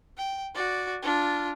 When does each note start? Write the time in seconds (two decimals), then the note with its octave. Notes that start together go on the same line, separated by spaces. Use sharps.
0.18 G5
0.55 F#4 D5
1.03 D4 F4